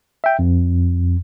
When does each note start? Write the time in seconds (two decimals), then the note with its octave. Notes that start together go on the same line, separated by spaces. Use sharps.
0.24 E5 G5
0.39 F2